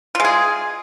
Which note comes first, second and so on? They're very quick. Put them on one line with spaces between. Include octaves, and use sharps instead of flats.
F4 G#3 G#4